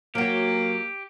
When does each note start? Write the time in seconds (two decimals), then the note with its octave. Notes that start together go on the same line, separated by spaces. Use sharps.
0.15 F#3 A#3 F#4 G4